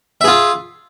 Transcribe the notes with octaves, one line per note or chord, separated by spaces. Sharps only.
F4 G#4 E5